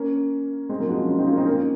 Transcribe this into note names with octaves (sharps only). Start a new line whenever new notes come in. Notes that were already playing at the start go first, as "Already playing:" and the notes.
Already playing: A#3 C#4
G#3 C4
F#3 A#3
F3 G#3
C#4 F4
C#4 F4
C4 D#4
C#4 F4
C4 D#4
A#3 C#4